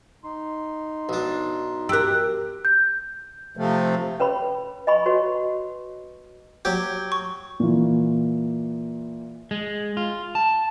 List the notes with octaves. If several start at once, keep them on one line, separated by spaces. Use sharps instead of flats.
D#4 C6
B1 D4
G4 A#4 E6 F#6
G6
C3 F3 A3
C#4 B4 C#5 B5
D#5 G#5 B5 C#6
F#4 B4 C#5
F#3 G4
C#6
A#2 E3
G#3
F4
A5